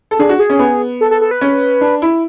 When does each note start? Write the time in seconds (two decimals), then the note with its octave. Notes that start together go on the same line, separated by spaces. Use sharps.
0.11 A4
0.19 D4 G#4
0.29 F#4
0.39 G#4
0.50 C#4
0.59 B3
1.01 A4
1.11 A4
1.21 A4
1.31 B4
1.41 C#4
1.81 D4
2.02 E4